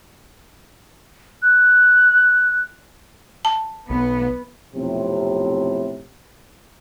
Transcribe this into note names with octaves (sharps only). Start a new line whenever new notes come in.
F#6
A5
B1 B3
B1 F2 A2 C3